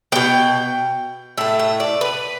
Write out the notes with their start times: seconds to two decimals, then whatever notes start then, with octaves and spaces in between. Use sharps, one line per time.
0.12 B2 B3 G5
1.38 A2 A3 E5
1.60 E5
1.80 D5
2.01 B4